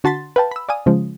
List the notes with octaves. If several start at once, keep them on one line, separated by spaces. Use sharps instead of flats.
D3 F#4 A5 C6 A6 B6
B4 F5 G5 A5
B5 E6
D5 F5 G#5 D#6
C#3 F3 G#3